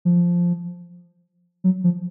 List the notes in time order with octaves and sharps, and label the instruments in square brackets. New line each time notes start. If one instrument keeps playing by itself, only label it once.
[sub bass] F3
F#3
F3